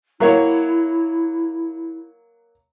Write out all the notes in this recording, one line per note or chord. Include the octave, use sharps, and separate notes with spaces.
F#3 A#3 E4 C#5